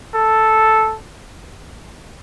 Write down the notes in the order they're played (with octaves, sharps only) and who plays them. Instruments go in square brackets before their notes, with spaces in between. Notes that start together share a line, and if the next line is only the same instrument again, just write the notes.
[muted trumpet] A4